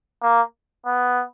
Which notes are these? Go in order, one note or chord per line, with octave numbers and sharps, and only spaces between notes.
A#3
B3